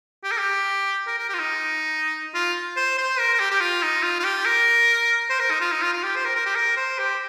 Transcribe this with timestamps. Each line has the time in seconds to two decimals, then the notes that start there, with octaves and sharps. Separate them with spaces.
0.24 G4
0.31 A#4
0.38 G4
1.07 A#4
1.18 A#4
1.29 G4
1.34 F4
1.39 D#4
2.35 F4
2.76 C5
2.98 C5
3.19 A#4
3.34 A#4
3.40 G4
3.51 G4
3.60 F4
3.82 D#4
4.03 F4
4.20 F4
4.24 G4
4.46 A#4
5.30 C5
5.40 A#4
5.50 D#4
5.61 F4
5.72 D#4
5.82 F4
5.93 F4
6.03 G4
6.16 C5
6.25 A#4
6.35 A#4
6.46 G4
6.56 A#4
6.77 C5
6.99 G4